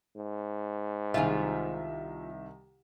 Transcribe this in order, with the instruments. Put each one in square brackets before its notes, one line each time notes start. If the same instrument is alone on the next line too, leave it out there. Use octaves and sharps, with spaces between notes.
[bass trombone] G#2
[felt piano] C2 D#3 E5 [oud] F4 G4 G#4